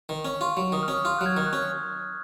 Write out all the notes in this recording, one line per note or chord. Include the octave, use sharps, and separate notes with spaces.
D#3
C#4
F4 C#6
F#3
D#3 D#6
F6
C#4
D#6
F4 F6
F#3 F#6
F6 G#6
D#3
F#6
C#4